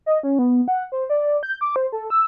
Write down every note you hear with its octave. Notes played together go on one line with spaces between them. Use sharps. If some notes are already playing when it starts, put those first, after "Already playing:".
D#5
C#4
B3
F#5
C5
D5
G6
D6
C5
A4
E6